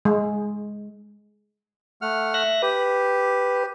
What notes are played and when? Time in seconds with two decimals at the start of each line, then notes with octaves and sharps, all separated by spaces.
0.05 G#3
2.02 A3 F#5 F6
2.34 E5 F#6 A#6
2.62 G4 B4